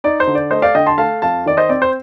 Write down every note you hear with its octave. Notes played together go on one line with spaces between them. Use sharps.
D#4 D5
C5
D3
D5
A3 C5 D#5
D5 F5
D3 D#5 G5
A5 C6
A3 F5 A5
F2 F5 A5
D#3 D5
C5 D#5
C4 D5
C5